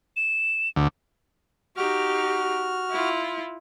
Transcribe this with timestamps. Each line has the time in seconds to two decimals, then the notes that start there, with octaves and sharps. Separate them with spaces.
0.16 E7
0.76 D2
1.77 D#4 F#4 G4 F6
2.91 E4 F4